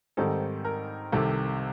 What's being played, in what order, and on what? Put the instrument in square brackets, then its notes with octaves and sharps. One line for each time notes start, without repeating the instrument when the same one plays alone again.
[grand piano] G#2 D#3 G3 C4 D#4 A4
A#4
C2 C3 D#3 A4